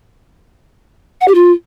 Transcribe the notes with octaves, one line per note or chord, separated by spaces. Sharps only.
F#5
G4
F4